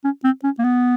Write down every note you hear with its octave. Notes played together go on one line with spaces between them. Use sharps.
C#4
C4
C#4
A#3
B3